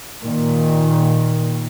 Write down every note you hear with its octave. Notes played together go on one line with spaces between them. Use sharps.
A#2 D#3